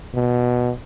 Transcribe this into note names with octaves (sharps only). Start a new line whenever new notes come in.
B2